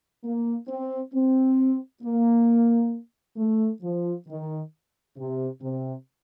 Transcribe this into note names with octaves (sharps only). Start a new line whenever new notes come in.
A#3
C4
C4
A#3
A3
F3
D#3
C3
C3